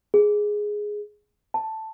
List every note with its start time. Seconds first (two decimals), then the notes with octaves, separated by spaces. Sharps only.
0.14 G#4
1.54 A5